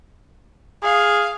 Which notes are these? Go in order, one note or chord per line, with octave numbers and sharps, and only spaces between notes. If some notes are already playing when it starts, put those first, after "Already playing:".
G#4 F5